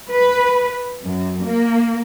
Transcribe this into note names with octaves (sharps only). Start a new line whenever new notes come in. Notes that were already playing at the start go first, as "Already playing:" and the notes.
B4
F#2
A#3